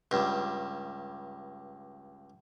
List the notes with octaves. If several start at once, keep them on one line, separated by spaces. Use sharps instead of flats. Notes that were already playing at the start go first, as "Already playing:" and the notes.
C#2 G2